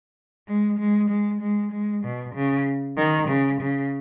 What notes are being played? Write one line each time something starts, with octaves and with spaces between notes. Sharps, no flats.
G#3
G#3
G#3
G#3
G#3
B2
C#3
D#3
C#3
C#3